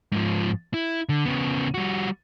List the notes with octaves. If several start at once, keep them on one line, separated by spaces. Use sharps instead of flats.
G#2 F3
E4
D3
C#3 B3
G3 F#4